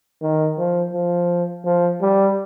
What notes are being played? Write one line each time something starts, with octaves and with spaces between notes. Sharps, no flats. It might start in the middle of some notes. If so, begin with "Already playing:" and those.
D#3
F3
F3
F3
G3